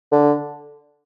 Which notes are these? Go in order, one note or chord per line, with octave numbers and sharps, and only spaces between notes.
D3